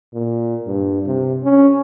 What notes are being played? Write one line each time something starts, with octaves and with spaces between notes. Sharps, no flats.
A#2
G2
C3
C#4